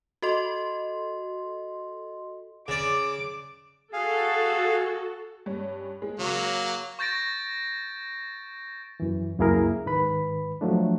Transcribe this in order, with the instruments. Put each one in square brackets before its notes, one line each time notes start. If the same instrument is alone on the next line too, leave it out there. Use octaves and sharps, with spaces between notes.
[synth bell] F#4 A4 D#5 C6
[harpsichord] C#3 D5 [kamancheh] D6
[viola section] F#4 A4 [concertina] G#4 F5
[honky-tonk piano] G2 C#4
G#3
[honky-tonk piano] C#3 [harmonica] F#3 A#3
[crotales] C#6 G6 A6 A#6 D7
[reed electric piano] F#2 E3
C#2 F#2 A#3 E4 G#4 A#4
G#2 D#3 B4 B5
F3 F#3 A3 D4